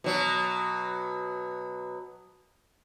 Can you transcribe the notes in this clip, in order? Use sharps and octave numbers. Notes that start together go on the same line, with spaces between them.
B2 F#3